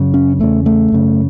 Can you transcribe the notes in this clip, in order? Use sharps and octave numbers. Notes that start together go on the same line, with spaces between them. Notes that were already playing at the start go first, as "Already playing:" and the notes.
Already playing: F#2 C#3
C#4
E2 C#3 A3
A3
F#2 C#3